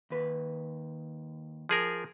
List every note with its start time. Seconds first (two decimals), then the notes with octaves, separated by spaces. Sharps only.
0.10 D#2 B4
1.69 F3 G#4 A#4